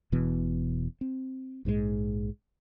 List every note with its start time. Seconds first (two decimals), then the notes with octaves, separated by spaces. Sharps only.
0.12 E1 B2 E3 B3
1.01 C4
1.65 A#1 G#2 B2 G#3